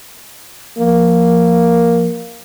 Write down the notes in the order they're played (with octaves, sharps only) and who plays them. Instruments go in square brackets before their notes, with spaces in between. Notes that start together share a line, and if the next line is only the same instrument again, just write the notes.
[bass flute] F3 [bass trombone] A#3